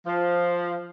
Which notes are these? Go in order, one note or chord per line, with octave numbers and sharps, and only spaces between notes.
F3